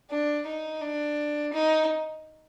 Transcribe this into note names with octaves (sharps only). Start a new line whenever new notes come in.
D4
D#4
D4
D#4